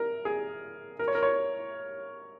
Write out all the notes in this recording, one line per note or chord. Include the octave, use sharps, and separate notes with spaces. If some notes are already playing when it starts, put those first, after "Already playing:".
Already playing: A#4
G#4
A#4
C#5
A#4
C#5